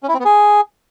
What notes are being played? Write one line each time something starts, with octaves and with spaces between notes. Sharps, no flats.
C#4
E4
C4
B3
G#4